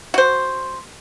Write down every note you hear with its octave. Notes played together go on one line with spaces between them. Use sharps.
F#4 C5